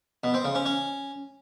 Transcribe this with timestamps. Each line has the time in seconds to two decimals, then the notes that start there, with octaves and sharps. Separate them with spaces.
0.24 B2
0.34 C4
0.45 C#3
0.55 C#4
0.66 C#4